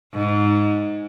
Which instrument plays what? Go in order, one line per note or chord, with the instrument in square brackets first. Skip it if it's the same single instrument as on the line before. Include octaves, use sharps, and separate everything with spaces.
[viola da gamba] G#2